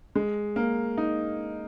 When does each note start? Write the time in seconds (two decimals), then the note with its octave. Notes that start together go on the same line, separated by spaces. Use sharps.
0.15 G#3
0.56 A#3
0.97 D#4